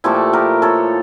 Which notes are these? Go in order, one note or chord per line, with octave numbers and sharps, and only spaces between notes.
A#2 F3 A3 E4 G4
G4 A#4
A4 C#5